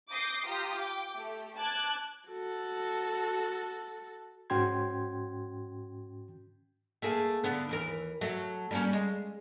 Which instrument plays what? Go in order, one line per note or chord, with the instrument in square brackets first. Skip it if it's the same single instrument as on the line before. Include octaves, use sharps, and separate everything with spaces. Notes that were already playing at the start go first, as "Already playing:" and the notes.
[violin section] D6 D#6 G6 A#6 C7
F4 G4 A#5 D#6
G5 D6
A3 G4
A5 D6 F#6 G#6
[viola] F#4 A4
[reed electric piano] G#2 C#4 F#4 G5 C6 G#6
[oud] A3 A#3 G#4
D3 B3
D#2 E3 A#4
F#3 A3
G3 A#3 C#4
G#3